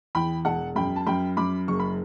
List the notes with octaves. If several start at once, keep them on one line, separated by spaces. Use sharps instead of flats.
E2 G5 B5
E1 F#5 A5
F#2 G5 B5
A5
F#2 G5 B5
F#2 B5 D6
F#1 C#6
B5